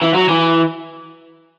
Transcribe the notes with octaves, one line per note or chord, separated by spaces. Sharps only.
E3
F#3
E3